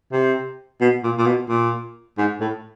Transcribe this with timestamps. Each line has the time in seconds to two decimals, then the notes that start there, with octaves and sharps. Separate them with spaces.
0.12 C3
0.81 B2
1.03 A#2
1.18 A#2
1.26 B2
1.49 A#2
2.18 G#2
2.40 A2